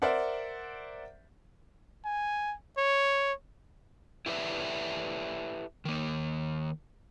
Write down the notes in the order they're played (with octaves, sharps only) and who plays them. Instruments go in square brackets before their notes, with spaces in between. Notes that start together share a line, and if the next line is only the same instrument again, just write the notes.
[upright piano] A#4 C5 D5 E5 F#5
[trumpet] G#5
C#5
[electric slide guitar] E4 G4 A4 B4 D5 E5
D#3 A#3